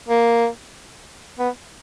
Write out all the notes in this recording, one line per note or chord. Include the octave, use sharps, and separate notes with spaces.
A#3
B3